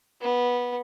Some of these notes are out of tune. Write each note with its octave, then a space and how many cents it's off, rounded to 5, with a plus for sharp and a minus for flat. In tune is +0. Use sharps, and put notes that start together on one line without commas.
B3 -15